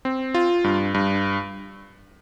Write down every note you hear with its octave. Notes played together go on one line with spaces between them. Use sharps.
C4
F4
G2
G2